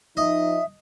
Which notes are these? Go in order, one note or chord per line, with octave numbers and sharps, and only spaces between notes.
F3 D#4 D#5 E5